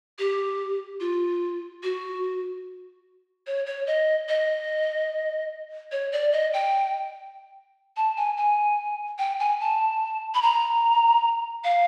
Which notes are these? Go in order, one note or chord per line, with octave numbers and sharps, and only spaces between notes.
G4
F4
F#4
C#5
C#5
D#5
D#5
C#5
D5
D#5
G5
A5
G#5
G#5
G5
G#5
A5
B5
A#5
F5